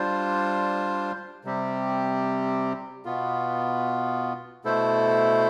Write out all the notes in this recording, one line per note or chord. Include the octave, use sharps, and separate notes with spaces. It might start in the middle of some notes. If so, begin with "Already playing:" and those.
Already playing: G3 D4 F4 C5
C3 G3 C4 G4
B2 B3 F4
B2 A3 E4 A4 C5